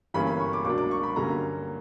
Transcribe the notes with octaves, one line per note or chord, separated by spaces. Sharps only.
G1 G2 E3 A#3 C#4 B5
B5
C#6
D6
C#2 B2 F#3 A#3 D4 D6
D6
C#6
B5
G2 D3 F#3 A#3 C#4 A#5